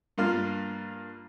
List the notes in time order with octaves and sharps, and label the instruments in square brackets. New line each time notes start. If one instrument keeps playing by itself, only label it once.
[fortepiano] G2 A#3 F4